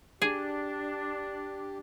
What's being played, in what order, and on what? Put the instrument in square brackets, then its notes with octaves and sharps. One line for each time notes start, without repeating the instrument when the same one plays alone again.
[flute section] D4 [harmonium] G4 [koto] G#4